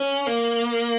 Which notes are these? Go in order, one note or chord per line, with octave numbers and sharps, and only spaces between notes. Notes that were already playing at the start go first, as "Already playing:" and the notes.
Already playing: C#4
A#3